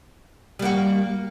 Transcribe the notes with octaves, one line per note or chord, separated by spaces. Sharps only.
G3 A#3 F#4